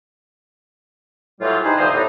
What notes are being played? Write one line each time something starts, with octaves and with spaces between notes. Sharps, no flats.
A2 E3 F#3 G3 F4
D#4 G4 G#4 B4 C5
D2 G2 C3 F3 C5 D#5
A2 G3 B3 D4 D#4